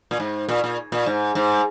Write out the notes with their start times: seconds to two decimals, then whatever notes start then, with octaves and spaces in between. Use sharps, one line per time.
0.11 A#2
0.20 G#2
0.49 A#2
0.64 A#2
0.92 A#2
1.06 G#2
1.35 G#2